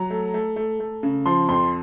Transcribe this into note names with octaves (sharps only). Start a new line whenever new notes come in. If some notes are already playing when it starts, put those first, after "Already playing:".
Already playing: F#3 A#5
A3
A3
A3
A3
C#3
F3 C6
F2 C6